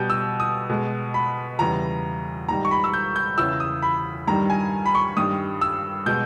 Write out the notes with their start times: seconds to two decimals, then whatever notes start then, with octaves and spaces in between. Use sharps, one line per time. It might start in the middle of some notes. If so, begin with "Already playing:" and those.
Already playing: B2 G3 G6
0.10 E6
0.40 D#6
0.69 B2 G#3
1.14 B5
1.59 E2 C#3 E3 G3 A#5
2.48 G#2 D#3 G3 A#5
2.65 C#6
2.71 B5
2.84 E6
2.94 G6
3.16 G6
3.38 E2 C#3 E3 E6
3.60 D#6
3.82 B5
4.27 G2 D#3 G3 A#5
4.50 G#5
4.86 B5
4.95 C#6
5.17 G2 D#3 G3 D#6
5.61 E6
6.06 B2 G#3 G6